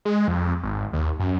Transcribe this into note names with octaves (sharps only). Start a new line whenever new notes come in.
G#3
F2
G#1
D#2
F#2